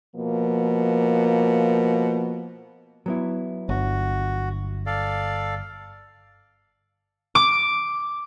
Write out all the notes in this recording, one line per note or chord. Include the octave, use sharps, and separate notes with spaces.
B2 F3 A#3
F#3 B3 E4
G1 F#4
A4 D5 F5
D6